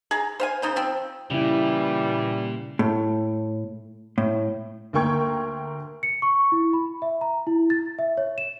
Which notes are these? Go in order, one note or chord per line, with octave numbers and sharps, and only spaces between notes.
G#4 A#5
C5 F5 G#5
C#3 D#4 C5
F3 C4
A#2 C#3 E3 G3 E4
A2
A2
D2 A#3 A#4 G5 C#6 G#6
C#7
C#6
E4
B5
E5
A#5
E4
A6
E5
C#5
E7